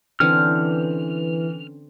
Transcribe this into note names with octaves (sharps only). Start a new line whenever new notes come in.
D3 E3 C4 C#4 F6
E3